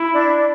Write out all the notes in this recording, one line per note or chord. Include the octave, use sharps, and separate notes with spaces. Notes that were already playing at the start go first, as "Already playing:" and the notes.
Already playing: E4
D4